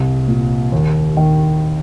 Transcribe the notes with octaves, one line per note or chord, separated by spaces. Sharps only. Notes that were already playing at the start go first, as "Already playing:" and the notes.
Already playing: C2
A#2
D#2
D#3